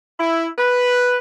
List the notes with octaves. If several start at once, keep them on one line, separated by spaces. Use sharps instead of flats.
E4
B4